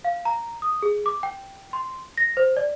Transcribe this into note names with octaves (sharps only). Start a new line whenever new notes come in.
F5
A#5
D#6
G#4
D6
G5
C6
A#6
C5
D5